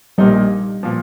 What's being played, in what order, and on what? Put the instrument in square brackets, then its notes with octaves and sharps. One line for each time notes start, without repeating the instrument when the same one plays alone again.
[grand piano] A#1 A#2 A#3 D#4 [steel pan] G3
[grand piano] A#2 F3